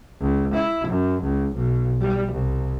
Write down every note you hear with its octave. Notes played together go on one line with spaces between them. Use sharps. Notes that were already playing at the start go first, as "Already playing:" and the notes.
C#2
E4
F#2
C#2
B1
G3
C2